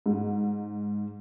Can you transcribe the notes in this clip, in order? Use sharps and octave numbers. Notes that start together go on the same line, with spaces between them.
G#2